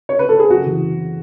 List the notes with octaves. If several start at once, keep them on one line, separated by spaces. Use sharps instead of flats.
C#5
B4
A4
G#4
F#1 F#4
E3